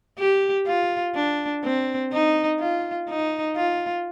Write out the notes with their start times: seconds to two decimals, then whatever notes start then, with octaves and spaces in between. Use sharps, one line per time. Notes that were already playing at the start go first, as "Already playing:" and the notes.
0.19 G4
0.67 F4
1.15 D4
1.64 C4
2.13 D#4
2.60 F4
3.09 D#4
3.57 F4